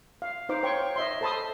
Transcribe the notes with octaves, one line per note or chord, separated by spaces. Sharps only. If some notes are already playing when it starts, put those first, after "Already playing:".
F5
D#4 C5 F5 D6
C5 C#5 G5 C#6
D#5 E5 C6
A4 C5 A5 B5 C6 D#6